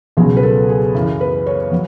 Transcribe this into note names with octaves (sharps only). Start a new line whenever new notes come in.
C#2 B2 F#3 G#4
B4
A4
G#4
F#2 C#3 E3
B4
C#5
F#3